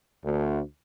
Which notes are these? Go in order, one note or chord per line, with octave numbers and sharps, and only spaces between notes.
D2